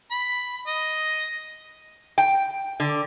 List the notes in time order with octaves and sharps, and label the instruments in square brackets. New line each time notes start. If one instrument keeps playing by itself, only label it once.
[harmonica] B5
D#5
[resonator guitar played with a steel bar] G5
D3